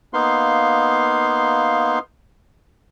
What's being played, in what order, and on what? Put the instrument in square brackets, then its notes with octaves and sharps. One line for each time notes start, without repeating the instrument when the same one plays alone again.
[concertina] A#3 B3 D#4 F5 C6